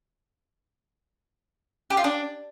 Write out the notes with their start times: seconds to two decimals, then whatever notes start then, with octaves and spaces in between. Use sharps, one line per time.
1.90 G4
1.97 F4
2.04 D4